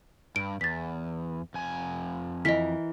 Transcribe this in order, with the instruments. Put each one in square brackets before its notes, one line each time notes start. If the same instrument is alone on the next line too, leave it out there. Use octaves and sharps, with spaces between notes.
[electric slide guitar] G2 [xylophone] D7
[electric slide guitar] E2 [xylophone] A6 B6
[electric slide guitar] F2 G#5
[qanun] E3 A#4 [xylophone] D#5 B6